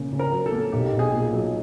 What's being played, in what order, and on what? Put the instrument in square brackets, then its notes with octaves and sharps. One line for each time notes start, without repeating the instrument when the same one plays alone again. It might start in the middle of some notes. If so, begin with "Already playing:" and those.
Already playing: [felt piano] C#3 A#3
C#3
[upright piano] A#4
[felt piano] F#3
[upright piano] A4
[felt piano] A#3
[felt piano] B1 [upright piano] G4
[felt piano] B1
[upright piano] G#4
[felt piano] A#2
F#3